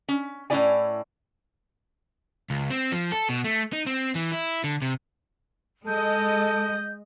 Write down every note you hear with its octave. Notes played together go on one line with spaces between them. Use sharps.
C#4
A2 A#3 C#4 E4 D5 G#5
C#2
C4
F3
A4
B2
A3
D#4
C4
E3
E4
D3
C3
G#3 A4 D#5 G6